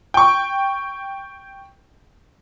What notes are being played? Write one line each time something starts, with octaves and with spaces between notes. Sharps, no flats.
G5 C#6